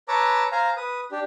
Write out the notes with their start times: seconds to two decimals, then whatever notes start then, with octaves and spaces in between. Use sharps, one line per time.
0.08 B4 C#5 A5 A#5 D6 E6
0.52 C5 F5 G#5 A#5
0.77 B4 D#6
1.11 D4 G4